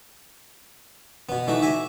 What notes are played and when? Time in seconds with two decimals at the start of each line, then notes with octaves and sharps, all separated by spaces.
1.29 B2 B3
1.47 E3 A3 D#4 F#4
1.62 E5 G#5 D6